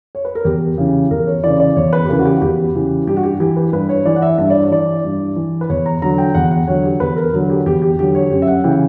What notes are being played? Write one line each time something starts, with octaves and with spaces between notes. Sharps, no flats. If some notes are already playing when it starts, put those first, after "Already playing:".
C#5
B4
A#4
E2 G4
C#3 E3
E2 A#4
C#5
C#3 E3 D5
D5
E2 C#5
B4
G4
C#3 E3 A#4
F#4
G4
F#4
E2 G4
C#3 E3
G2 G4
F#4
G4
E3 G4
B4
G2 B4
C#5
E3 D5
F#5
E5
G2 E5
D5
C#5
E3 D5
G2
E3
B4
E2 C#5
A#5
D3 F#3 A#5
G5
E2 F#5
F#5
D3 F#3 C#5
G4
E2 B4
A#4
D3 F#3
G4
E2 G4
G4
D3 F#3 G4
C#5
F#2 G4
E5
F#5
C#3 E3 G5